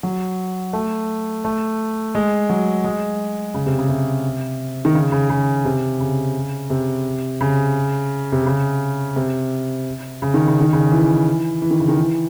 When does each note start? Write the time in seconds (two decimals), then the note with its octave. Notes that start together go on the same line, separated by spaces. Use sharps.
0.03 F#3
0.73 A3
1.45 A3
2.15 G#3
2.49 F#3
2.84 G#3
3.54 C#3
3.66 C3
3.78 C#3
3.89 C3
4.85 D#3
4.95 C#3
5.12 C#3
5.30 C#3
5.65 C3
6.00 C#3
6.70 C3
7.41 C#3
8.32 C3
8.46 C#3
9.16 C3
10.22 C#3
10.34 D#3
10.47 C#3
10.61 D#3
10.73 C#3
10.92 E3
11.62 E3
11.71 D#3
11.79 C#3
11.88 D#3
11.97 E3